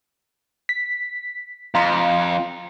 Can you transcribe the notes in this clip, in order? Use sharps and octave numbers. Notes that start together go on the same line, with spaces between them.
B6
F2 F5 A#5 C6